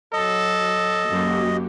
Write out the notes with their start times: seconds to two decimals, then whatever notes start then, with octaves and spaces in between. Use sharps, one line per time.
0.13 F#3 A4 D#5
1.10 F#2 A#3 F#4 G4